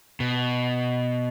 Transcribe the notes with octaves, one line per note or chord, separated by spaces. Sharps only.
B2